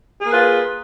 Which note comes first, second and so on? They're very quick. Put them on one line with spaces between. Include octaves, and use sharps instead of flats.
G#4 A#3 B4 F4